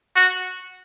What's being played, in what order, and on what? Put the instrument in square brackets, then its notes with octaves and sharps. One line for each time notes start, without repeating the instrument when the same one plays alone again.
[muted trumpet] F#4